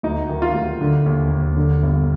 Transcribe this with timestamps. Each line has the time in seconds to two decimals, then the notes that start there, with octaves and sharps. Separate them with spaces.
0.03 D2 D#4
0.29 D#3
0.42 F4
0.54 D2
0.81 D3
1.06 D#2
1.31 D#2
1.57 D3
1.83 G1